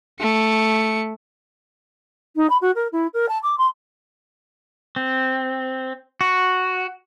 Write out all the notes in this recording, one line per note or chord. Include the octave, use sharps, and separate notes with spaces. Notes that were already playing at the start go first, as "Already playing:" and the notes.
A3 C#7
D#4
B5
F#4
A#4
E4
A#4
A5
D6
C6
C4
F#4